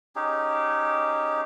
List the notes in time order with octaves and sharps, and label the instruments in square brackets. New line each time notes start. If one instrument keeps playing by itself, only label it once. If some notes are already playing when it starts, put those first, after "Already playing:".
[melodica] C#4 D#4 G4 G#4